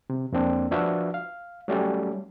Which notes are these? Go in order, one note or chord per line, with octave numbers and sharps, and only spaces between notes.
C3
F2 A#3 C4 D4
F3 D4 F#4 B4 E5 F5
F5
F#3 G3 A3 C#4 G4